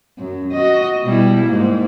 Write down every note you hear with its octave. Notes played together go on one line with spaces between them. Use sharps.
F#2
F#4 D#5
B2 G3 E4
G#2 A#3